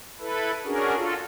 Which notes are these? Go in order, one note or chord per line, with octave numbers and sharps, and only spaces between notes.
E4 A4 B4
C#4 D4 F#4 G#4 A#4
F4 F#4 A4